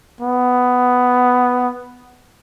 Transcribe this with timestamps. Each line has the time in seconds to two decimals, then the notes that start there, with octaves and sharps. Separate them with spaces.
0.21 B3